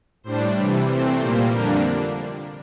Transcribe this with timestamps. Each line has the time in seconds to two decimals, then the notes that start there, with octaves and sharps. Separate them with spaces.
0.24 A2 G3 D4 C5
0.56 C3 E3 G3
0.87 C3 E3 A3 C4 C5
1.20 A#2 G3 A#3 C5
1.52 F2 D3 G3 A#3 D4 A#4